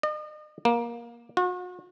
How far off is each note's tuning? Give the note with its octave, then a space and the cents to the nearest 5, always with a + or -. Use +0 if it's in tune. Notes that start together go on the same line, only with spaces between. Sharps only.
D#5 -40
A#3 +20
F#4 -40